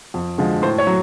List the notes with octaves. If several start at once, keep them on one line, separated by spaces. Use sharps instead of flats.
F2
D3 F3 G#3
A2 C5
C#5
F#3